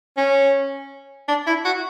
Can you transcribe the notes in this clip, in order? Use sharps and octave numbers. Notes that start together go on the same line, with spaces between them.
C#4
D4
E4
F#4